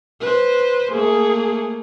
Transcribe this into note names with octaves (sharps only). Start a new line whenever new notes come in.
B4 C5
A3 A#3 G#4